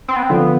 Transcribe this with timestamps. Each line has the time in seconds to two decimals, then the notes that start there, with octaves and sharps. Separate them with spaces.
0.08 C4
0.16 B3
0.23 C4
0.30 D3 F3 B3